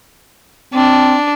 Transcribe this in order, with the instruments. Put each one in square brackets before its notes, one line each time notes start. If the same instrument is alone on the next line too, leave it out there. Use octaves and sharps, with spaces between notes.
[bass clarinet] C4 [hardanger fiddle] D4